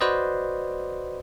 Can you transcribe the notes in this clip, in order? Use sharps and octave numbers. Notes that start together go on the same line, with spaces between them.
F#4 B4 C5 D5 D#5